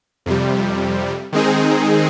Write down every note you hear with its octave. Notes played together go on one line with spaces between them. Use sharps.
F2 C3 G3
D#3 G#3 C4 D#4 G#4